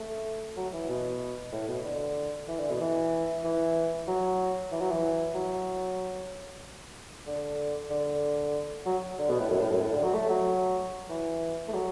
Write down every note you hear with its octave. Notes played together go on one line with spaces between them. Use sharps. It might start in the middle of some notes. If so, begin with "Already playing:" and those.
Already playing: A3
F#3
E3
B2
A2
B2
D3
E3
D3
B2
E3
E3
F#3
E3
F#3
E3
F#3
D3
D3
F#3
D3
B2
A2
F#2
A2
F#2
A2
D3
F#3
A3
F#3
E3
A3
F#3